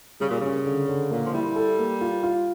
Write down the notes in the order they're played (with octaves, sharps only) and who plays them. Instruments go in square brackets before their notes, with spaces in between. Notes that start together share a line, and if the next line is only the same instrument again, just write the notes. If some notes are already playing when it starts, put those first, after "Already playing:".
[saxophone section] C#3 [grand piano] G3
[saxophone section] A#2
[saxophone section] C#3 [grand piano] C#4
[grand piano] D3
D3
[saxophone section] A#2 [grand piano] A#3
[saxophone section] F3
[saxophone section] G3 [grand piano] E4
[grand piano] A4
A#3
F4
F4